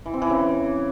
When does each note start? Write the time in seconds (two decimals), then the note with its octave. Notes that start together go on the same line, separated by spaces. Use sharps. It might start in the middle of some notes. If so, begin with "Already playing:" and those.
0.06 E3
0.14 C4
0.22 E3
0.30 C#3